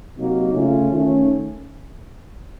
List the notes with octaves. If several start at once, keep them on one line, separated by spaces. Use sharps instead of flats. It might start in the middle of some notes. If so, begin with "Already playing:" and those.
C3 F#3 A#3 D#4 F#4
C#3 A3 C#4 F4
D#3 A3 C#4